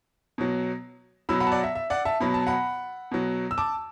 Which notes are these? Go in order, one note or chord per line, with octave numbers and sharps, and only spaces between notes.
B2 F#3
B2 F#3 B5 E6
F#5 B5
A5
D5 F#5
E5
E5
D5 F#5
E5 A5
B2 F#3 B5
A5
F#5 B5
B2 F#3
E6
A5 D6